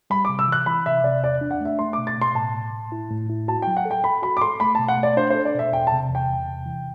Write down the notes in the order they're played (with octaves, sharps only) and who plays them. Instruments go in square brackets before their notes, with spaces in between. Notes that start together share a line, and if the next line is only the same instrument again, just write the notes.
[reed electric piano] G3 [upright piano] B5
[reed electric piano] C3 [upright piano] D6
[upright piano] E6
[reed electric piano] E3 [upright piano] F#6
[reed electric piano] E3 [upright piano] B5
[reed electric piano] C3 [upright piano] E5
[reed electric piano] C3 [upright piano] D5
[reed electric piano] E2 [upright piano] D5
[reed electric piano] D4
[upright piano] F#5
[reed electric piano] A3 [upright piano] E5
[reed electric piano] A3 [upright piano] C6
[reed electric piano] B2 [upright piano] D6
[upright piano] A6
[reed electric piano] B2 [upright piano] C6
[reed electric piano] A2 [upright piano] A5
[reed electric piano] A2
A2
E4
A2
E4
[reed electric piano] F#4 [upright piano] A5
[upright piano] G5
[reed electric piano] F#3
[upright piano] F#5
[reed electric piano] A4
[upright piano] G5
[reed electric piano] A4 [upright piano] B5
[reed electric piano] F#4 [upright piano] B5
[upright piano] D6
[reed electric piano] A4 [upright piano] C6
[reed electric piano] A3 [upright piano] B5
[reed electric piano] B2 [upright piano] A5
[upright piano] F#5
[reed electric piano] A3
[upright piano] D5
[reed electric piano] D4 [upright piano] C5
[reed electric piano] A4 [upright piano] C5
[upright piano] D5
[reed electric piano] B2 [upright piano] E5
[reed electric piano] E2 [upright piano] G5
[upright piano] A5
[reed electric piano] C3
[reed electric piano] E2 [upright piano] G5
[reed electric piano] E2
C3
E3